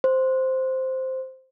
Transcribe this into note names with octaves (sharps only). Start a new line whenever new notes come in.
C5